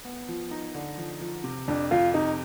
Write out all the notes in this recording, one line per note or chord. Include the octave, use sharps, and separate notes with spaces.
B3
F3
D#4
D3
F3
F3
C3
F2 D4
F2 F4
C3 D#4